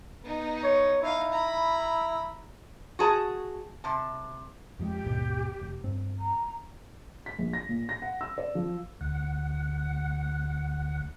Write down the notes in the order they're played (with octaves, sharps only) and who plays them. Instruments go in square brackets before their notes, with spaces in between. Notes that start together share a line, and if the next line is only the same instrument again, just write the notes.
[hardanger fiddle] B3 D#4
[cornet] C#5
[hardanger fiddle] D#4 F5 [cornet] E4
[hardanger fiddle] A#5 B5
[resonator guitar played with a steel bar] F#4 G#4 A5
C3 A5
[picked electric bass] F2 F3 G#3 [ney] G4
[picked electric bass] G#1 D#2 B2
F1
G2 C4
[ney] A#5
[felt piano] B6
A#1
A#6
A#2
A#6
F#5
E6
D5
F3
[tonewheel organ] D2 F#5